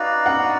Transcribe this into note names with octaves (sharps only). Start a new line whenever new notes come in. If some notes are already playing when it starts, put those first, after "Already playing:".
Already playing: D#4 F#4 B4 D5 F5
F#5